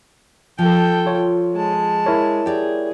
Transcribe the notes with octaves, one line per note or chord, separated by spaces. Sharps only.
F3 A4 G5
F4 C#5
G#3 A5
E4 A#4 C#5
G4 G#4 D5